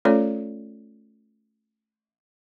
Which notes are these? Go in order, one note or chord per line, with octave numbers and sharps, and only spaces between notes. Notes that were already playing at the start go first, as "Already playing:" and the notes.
A3 C#4 F4 A4 C#5 D5